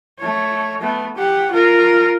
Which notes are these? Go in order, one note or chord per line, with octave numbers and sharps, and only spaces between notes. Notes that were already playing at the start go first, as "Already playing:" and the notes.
A3 C#5
A3 B3
G4 F#5
F4 A#4